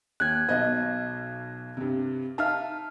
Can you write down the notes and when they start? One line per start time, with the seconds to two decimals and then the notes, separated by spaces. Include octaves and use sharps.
0.20 D#2 F#6 G#6
0.49 B1 B2 D#5
1.77 G2 C3
2.38 D#4 E5 F5 A5 F6